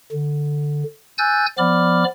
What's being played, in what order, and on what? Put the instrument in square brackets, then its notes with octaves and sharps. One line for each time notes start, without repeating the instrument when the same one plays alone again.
[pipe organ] D3
G#5 E6 F#6 G6 A6
F3 B3 D5 B5 D6 F6